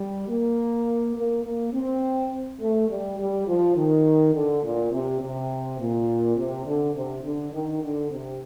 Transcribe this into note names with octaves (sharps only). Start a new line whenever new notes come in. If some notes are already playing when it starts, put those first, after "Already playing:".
Already playing: G3
A#3
A#3
A#3
C4
A3
G3
G3
F3
D#3
D3
A#2
C3
C3
A#2
C3
D3
C3
D3
D#3
D3
C3